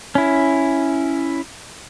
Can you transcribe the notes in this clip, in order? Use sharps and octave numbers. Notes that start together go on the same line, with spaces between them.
C#4 E4